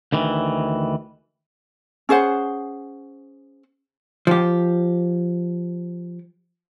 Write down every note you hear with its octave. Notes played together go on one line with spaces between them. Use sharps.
D2 D#3 E3
C#4 G#4 C5 F#5
F3 G4